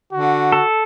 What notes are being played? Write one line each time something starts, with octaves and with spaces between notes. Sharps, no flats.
D3 F#4
A4